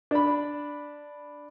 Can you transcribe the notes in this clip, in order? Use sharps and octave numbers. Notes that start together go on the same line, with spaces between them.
D4 B5